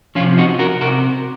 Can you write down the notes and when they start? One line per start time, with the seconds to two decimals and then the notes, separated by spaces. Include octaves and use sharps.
0.15 F3 C#4 F4
0.20 C3
0.38 D#4 F#4
0.59 F#4 A#4
0.81 C3 F#4 A#4